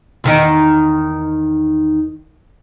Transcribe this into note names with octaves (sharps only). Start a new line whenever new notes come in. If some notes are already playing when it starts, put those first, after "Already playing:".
E2 D#3 D#4